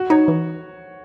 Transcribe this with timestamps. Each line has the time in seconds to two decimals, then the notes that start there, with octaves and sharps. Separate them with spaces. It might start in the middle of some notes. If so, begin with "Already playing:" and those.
Already playing: F#4
0.10 D#4 C#5
0.28 E3